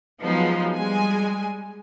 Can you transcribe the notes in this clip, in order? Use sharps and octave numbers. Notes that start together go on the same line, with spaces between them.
F3 F#3 G#3 B3 D#4
G3 G#3 G#5